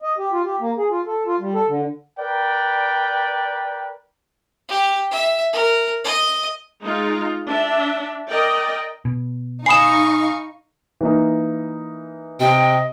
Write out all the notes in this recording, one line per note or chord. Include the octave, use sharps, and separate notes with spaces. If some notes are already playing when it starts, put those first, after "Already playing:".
D#5
G4
F4
G4
A#3
G#4
F4
A4
F4
G3
A4
D3
A#4 B4 D5 G5
G4
E5
A#4
D#5
G#3 D#4 F4
D4 E5
A#4 D5 D#5 G5
B2
D#4 F5 G#5 B5 C#6 D#6 C7 E7
E3 A#3 D#4
C3 D#5 G5